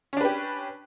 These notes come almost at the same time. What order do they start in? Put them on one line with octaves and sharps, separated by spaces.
C#4 D4 B4 G4